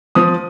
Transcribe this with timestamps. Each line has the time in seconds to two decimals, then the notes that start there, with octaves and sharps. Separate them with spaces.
0.15 F3 D#6